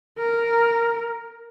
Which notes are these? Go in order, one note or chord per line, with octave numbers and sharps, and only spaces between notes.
A#4